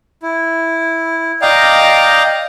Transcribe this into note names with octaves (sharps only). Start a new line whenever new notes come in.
E4
D5 D#5 F5 G5 A#5